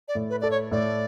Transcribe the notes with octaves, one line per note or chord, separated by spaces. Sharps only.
D5
A2
B4
A4 D5
C#5
A2 D5